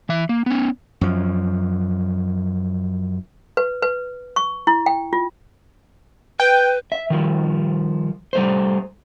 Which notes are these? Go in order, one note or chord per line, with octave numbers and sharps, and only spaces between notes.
E3 E5
A#3
B3 C#4
F#2 F3
B4
B4
C#6
E4
G5
F4
B4 G5
E5
D#3 F3 G3
G3 A3 C5